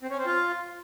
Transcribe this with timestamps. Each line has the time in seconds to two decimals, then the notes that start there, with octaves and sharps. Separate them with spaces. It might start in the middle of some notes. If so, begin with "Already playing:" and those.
0.02 C4
0.10 C#4
0.18 C4
0.26 F4